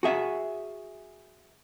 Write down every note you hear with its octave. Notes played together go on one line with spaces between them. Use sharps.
F#4 G#4 E5